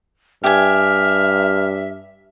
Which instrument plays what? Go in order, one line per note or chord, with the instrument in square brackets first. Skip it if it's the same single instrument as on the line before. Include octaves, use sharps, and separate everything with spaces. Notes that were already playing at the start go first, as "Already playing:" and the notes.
[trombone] G2 [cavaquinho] G4 G#5 [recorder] E5 [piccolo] F6